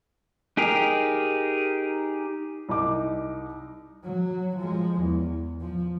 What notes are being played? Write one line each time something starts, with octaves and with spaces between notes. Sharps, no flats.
D#4 G4 G#4 A#4
C2 D#4 D6
F#3
F3 G#3
E2
F3